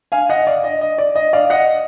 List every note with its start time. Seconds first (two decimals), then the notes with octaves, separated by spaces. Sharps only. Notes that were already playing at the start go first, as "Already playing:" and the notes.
0.12 F5 G#5
0.29 D#5 F#5
0.47 D5 F5
0.64 D#5
0.81 D#5
0.98 D5
1.16 D#5
1.33 D5 F5
1.50 D#5 F#5